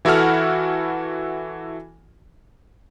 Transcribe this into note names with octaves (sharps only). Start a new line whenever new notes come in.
E3 E4 F#4 A4 F#5 F6